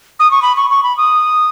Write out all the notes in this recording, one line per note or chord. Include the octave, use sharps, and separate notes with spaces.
D#6
C#6
B5
C#6
C#6
B5
D#6